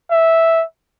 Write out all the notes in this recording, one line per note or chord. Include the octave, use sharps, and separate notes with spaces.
E5